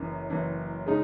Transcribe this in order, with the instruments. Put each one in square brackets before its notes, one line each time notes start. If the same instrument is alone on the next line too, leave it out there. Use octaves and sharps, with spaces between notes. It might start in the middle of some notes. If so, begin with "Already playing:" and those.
Already playing: [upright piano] F#1 F#2 E3
F#1 F#2 E3
C#3 G#3 D#4